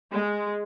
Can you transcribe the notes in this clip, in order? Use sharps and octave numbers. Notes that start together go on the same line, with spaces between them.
G#3